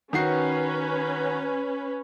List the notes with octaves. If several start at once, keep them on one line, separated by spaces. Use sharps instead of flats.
D#3 C#4 F#4 B4 C7